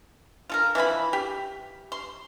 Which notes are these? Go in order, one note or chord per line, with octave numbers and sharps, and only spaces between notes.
F4 A4 A#4
E3 F3 F4 B5
G4
C6